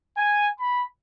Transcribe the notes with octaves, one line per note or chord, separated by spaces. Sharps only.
G#5
B5